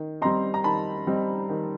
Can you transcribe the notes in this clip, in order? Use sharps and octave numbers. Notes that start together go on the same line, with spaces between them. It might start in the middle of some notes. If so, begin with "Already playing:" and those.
Already playing: D#3
G3 C4 D#4 A#5 C6
A#5
D#3 A5 B5
G3 C4 D#4
D#3